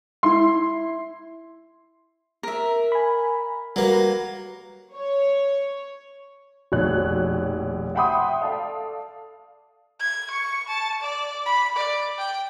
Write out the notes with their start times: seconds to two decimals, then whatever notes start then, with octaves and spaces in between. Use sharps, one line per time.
0.23 E4 C6
2.43 A#4 E5
2.92 G#5 B5
3.76 F#3 G3 A#3 B4
4.93 C#5
6.72 F1 A#1 B2 D#3 C#5 F#6
7.95 E5 F#5 G5 B5 C6 D#6
8.42 A4 D5 F5
10.00 G#6
10.31 C#6
10.68 A5
11.01 D5
11.46 B5
11.76 D5
12.18 G5